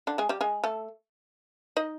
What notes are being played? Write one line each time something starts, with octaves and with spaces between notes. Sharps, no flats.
D3 D4
G#3 G#4
G3 G4
G#3 G#4
A3 A4
D#4 D#5